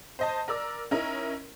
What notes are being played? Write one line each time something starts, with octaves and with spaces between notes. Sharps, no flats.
C5 D#5 A5
A#4 D5 E6
C#4 D#4 E4 A#4